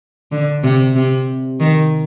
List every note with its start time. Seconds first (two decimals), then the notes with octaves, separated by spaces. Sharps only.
0.32 D3
0.64 C3
0.95 C3
1.60 D#3